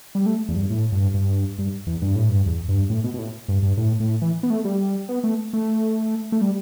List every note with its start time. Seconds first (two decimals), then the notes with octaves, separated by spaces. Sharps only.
0.15 G3
0.26 A3
0.49 E2
0.55 G2
0.70 A2
0.92 G2
1.14 G2
1.59 G2
1.87 E2
2.02 G2
2.16 A2
2.29 G2
2.46 E2
2.68 G2
2.90 A2
3.04 B2
3.14 B2
3.19 A2
3.48 G2
3.63 G2
3.77 A2
4.00 A2
4.22 E3
4.43 B3
4.50 A3
4.65 G3
5.09 B3
5.24 A3
5.53 A3
6.32 A3
6.41 G3